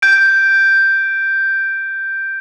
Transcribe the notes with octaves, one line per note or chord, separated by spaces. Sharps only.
G6 D7